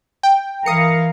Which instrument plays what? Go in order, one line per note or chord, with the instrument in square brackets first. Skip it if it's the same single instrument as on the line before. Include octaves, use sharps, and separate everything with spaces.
[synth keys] G5
[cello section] E3 A#4 F5 [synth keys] D#6 C#7